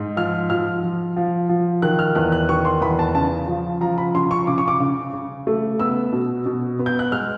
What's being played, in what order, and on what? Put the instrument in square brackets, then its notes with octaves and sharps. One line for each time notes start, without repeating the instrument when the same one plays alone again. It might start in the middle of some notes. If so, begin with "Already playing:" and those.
Already playing: [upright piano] G#2
F3 F6
F3 F6
F3
F3
F3
D#3 F#6
F6
E2 F#6
F#6
D#3 C#6
C6
E2 B5
A5
C#3 A5
F3
F3 A#5
B5
C#3 C6
C#6
C#3 D6
C#6
D6
C#3
C#3
A3
B3 E6
B2
B2
B3
G6
F#6
G#3 F6